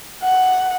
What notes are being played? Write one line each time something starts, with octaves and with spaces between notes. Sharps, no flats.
F#5